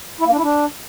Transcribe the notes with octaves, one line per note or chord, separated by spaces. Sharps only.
E4
A#3
D4
E4
D4